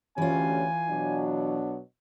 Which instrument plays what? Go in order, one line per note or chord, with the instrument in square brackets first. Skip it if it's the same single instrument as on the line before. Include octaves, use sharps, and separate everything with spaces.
[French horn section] D2 C#4 G4 [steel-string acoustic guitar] E3 F4 [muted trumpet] G#5
[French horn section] B2 F#3 D4